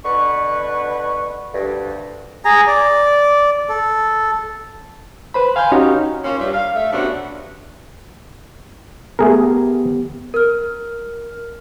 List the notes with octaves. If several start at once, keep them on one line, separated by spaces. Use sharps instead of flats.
B2 D3 B4 C#6
D2 G2
G#4 G#5 A#5
D5
A4
B4 C5 B5
F5 G#5 C6 F6 G6
C#4 D#4 F#4 G4 C#5
A#3 C#4 F4
G2 E5
F5
A3 E5
C3 A3 B3 C#4 D4 F#4
A3 B3 G4 G#4 A#4
A#4 F6